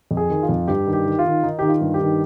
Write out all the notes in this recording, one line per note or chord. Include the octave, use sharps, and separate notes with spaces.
F2
G#4
D#3
F4
F2
G2 G4
D#3
G4
D#3
F4
D#3
D#3 D#4
D#3 G4
F4
G2
G4
D#3